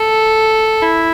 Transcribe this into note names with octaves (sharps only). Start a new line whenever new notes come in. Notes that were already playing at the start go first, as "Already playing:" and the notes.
Already playing: A4
E4